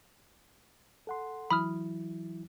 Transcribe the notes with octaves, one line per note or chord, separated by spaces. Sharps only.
A4 F#5 C6
E3 F#3 E4 B5 D#6 F6